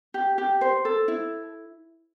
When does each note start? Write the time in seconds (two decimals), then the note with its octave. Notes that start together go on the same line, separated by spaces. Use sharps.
0.14 G4
0.38 G4
0.61 C5
0.85 A4
1.08 E4